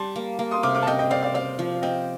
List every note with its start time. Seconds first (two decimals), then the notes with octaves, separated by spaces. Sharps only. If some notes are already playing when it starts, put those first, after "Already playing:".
Already playing: G3 A5 C6
0.16 A#3
0.39 A#3
0.51 C6 D#6
0.63 C3 D6 F6
0.75 D6 F6
0.83 A5
0.87 C4 D#5 G5
0.99 D#5 G5
1.10 C4 D5 F5
1.22 D5 F5
1.34 C4 D5 F5
1.59 F3
1.82 C4 D#5 G5